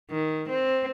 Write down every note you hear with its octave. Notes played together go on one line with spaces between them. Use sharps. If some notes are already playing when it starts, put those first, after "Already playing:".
D#3
C4